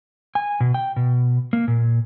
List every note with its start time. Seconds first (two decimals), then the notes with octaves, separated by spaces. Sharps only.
0.35 G#5
0.60 B2
0.74 G5
0.96 B2
1.53 A#3
1.68 A#2